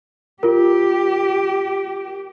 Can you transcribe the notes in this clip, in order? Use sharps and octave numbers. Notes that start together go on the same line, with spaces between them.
F4 G4 A#4